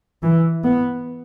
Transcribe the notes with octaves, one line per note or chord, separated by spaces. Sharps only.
E3
B3